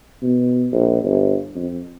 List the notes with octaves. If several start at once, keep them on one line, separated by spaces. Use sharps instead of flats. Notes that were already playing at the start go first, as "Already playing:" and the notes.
B2
A#1
G1
F2